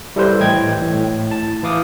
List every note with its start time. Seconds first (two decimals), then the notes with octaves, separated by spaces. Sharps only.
0.16 G3 E4 A4 B4 C5
0.40 A2 E3 D#5 G5 G#6
0.82 A2
1.31 A5
1.63 E3 E4 F5 D6 D#6